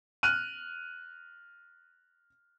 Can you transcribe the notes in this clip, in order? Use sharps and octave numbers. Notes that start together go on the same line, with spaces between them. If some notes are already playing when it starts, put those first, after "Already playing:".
F6 F#6 D#7